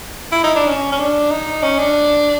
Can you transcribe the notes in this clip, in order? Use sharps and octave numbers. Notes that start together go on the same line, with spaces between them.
E4
D#4
D4
C#4
C#4
D4
D#4
C#4
D4